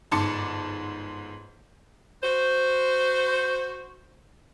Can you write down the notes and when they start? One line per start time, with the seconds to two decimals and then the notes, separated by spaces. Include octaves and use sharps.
0.11 G1 G#2 A5 C6 D6 C#7
2.22 F#4 C5